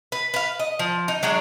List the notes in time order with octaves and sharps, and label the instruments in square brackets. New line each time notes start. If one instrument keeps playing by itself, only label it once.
[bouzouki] B4
B4 F5
D#5
F3
D#4
F#3 G#3 D4